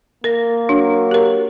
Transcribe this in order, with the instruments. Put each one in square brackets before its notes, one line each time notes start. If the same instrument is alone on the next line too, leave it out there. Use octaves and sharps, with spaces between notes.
[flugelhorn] A#3 [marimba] A#4 A#6
[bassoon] F#3 [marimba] D4
[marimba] G4 A#4